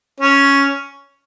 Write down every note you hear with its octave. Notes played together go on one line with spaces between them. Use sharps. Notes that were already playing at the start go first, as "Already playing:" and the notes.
C#4